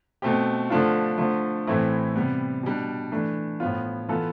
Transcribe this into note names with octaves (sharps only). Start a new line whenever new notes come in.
B2 A3 C4 G4
D3 F3 A3 D4 F4
D3 F3 A3
A2 E3 A3 C4 E4
C3 G3 B3
B2 G3 D4
E3 A3 D4
A2 F3 B3 F4
E3 B3 F4 A4